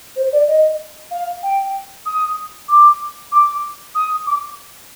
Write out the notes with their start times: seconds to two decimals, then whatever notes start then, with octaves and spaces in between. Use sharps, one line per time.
0.16 C5
0.32 D5
0.47 D#5
1.10 F5
1.42 G5
2.05 D#6
2.68 D6
3.31 D6
3.94 D#6
4.26 D6